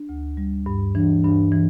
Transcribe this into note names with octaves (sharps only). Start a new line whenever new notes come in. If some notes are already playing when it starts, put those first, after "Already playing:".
Already playing: D4
D2
G3
G2
E3 D4
G2 D4
E3